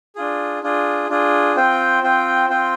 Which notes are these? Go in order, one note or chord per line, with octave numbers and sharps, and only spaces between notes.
D4 F4 G#4
D4 F4 G#4
D4 F4 G#4
C4 F4 C5 G5
C4 F4 C5 G5
C4 F4 C5 G5